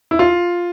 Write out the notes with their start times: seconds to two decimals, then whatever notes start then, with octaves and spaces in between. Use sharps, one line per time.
0.11 E4
0.19 F4